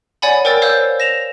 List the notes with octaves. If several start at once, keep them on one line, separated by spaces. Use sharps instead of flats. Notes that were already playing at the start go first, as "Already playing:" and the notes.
C#5 D5 F#5 G#5 B5
A#4 C5 G5 E6 A6
C5 C#5 F5 E6 G6
A#6 E7 F7